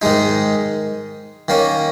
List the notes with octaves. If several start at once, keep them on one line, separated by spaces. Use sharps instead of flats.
G#2 D#3 G#3 D#4
D#3 A#3 C#4